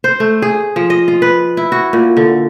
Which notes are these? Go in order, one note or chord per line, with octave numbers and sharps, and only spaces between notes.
C5
A3
G#4
F3
D#5
F4
B4
E4
F#4
A#2
D3